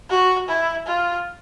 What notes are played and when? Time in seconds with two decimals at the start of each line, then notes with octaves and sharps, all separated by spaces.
0.10 F#4
0.48 E4
0.87 F4